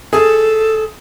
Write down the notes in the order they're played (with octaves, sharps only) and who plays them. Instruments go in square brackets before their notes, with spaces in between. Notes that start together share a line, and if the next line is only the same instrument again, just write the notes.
[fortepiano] G#4 [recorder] A4